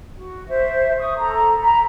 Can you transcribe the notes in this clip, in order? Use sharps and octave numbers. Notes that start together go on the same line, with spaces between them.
F#4
C5 E5
C#6 D#6
A4 A#5
A#5 B5